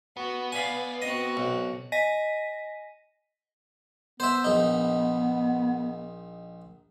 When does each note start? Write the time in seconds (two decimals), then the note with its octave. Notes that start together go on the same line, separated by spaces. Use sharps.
0.17 B3 F#4
0.52 D5 F5 G#5 B5
1.02 C4 F#4 D#5
1.37 B1
1.92 D#5 G#5 A#6 B6 D#7
4.20 B3 C5 E5
4.44 A#1 D#4